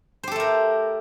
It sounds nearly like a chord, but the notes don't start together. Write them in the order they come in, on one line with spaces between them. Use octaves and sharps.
C5 G4 A4 A3 A#4